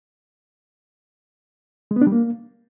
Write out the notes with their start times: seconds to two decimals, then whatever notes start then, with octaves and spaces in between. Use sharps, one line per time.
1.91 G#3
1.96 B3
2.01 D4
2.07 G3
2.12 A#3